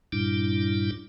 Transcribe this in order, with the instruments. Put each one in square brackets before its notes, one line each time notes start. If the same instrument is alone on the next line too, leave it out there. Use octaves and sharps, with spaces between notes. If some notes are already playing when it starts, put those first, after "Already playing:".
[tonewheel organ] G2 A#2 G3 D4 E4